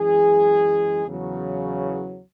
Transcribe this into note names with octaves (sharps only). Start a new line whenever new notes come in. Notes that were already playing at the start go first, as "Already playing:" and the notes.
Already playing: F#2 E3 G#3 G#4
E2 C#3 F#3